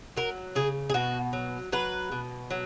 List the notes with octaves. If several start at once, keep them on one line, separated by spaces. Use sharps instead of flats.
F#3 A#4
C#3 G#4
G#4
B2 F#4
F#3
F#3 B4
B2
F#3